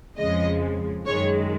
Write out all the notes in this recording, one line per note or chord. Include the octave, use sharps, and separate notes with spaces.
F2 C#3 F3 G#3 D#5
F#2 D#3 G#3 C#5